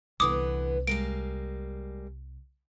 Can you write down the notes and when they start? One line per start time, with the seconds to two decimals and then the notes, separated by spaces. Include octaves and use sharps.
0.20 C2 D3 E3 B3 D6 D#6
0.87 G3 G#3 A#3 D7